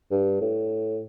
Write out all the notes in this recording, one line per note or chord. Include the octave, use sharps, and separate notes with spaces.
G2
A2